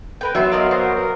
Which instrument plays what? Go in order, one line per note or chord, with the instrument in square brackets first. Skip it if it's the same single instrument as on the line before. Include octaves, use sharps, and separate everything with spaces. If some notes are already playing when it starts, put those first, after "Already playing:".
[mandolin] A#4 B4 G5
[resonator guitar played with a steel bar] F#3 B3 [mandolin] E5 C6
[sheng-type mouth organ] A#4 F5 [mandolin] D5 D#5 C6
[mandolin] F#4 [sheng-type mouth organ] A#4 C5
[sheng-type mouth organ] A#4